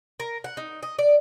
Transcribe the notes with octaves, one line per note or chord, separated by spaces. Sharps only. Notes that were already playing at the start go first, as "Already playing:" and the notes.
A#4
F#5
D#4
D#5
D5